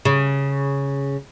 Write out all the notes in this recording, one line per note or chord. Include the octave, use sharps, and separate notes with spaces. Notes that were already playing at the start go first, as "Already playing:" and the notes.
C#3